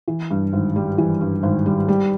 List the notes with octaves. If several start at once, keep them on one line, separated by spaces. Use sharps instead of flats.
E3
G2
G#1
G3
E3
G2
G#1
G3
G3